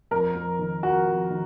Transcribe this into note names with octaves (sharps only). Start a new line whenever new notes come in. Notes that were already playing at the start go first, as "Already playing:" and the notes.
F2 A#4
F2
D#3
F2 F#4
F2
D#3